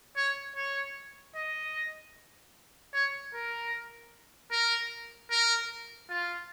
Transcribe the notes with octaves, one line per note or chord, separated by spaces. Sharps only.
C#5
C#5
D#5
C#5
A#4
A#4
A#4
F4